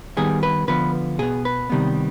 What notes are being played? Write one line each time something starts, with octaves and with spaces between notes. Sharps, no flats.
D#3 G3 B3 G#4
B4
D3 F3 B3 B4
B2 B3 G#4
B4
C3 D#3 G3 B3